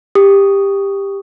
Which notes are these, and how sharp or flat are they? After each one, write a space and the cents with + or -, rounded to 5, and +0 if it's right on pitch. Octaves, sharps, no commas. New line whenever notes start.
G4 +15 D#6 -10